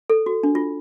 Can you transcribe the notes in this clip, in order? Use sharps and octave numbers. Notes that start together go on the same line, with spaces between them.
A4
F#4
D4
F4